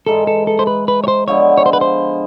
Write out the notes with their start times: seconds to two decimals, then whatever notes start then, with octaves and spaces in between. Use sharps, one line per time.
0.06 G#2 E3 G#3 A4
0.27 A4
0.47 A4
0.59 C5
0.67 B4
0.88 B4
1.04 C#5
1.08 C5
1.28 D3 F3 G#3 B3 C#5
1.58 C#5
1.66 C5
1.73 B4
1.81 C5